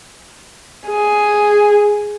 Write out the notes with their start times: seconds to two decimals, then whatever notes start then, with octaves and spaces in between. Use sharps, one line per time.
0.87 G#4